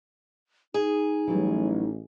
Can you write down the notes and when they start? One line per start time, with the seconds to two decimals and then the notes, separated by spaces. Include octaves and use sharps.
0.74 D#4 G#4
1.27 A1 E3 F#3 G3